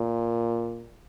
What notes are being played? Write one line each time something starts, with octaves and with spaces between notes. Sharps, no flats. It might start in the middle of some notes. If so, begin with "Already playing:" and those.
Already playing: A#2